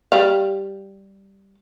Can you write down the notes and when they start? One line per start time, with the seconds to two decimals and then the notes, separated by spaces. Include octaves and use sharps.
0.12 G3 F5